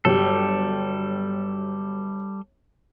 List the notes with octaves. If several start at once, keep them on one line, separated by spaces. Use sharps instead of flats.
G1 F#3 G3 G4 A4